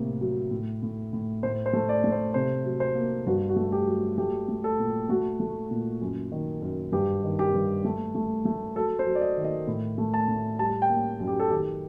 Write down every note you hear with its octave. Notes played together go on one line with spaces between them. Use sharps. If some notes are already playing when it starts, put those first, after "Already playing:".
Already playing: A2 C3 A#3
F#3
A2
A2
A2
A2 C5
C5
A3
D5
A3
C5
C3 C5
F#3
C5
A#3
G2 F#4
F#4
A3
G4
F#3
A3 G4
A3
A4
A#2
A3 F#4
A3
A#2
F#2
D#3
F#2
G2 G4
D#3
G4
G2
A3
A3
A3
F#3 A4
C5
F#3
D5
D#5
D#3
D#5
A2
A3
A5
A2
G3 A5
G5
A#3
F#2
G4
A4
D#3 G4